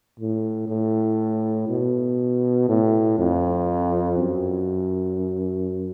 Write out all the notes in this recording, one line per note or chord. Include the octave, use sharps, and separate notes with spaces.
A2
A2
B2
A2
F2
F#2